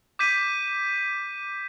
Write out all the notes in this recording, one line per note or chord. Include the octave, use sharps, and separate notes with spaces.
D6 G6 B6 D#7